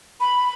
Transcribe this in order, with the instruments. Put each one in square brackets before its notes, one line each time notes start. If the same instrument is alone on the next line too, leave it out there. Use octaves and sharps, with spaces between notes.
[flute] B5